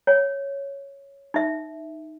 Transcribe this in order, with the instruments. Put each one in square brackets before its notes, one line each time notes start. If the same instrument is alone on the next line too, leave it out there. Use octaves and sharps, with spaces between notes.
[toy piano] C#5
D#4 E5